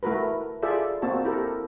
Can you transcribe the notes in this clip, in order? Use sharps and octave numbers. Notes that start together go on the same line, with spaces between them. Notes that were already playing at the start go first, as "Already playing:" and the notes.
A3 E4 F#4 A#4 B4
F4 G#4 A4 D5 E5
A#3 C4 F#4 A5
E4 G4 A4 A#4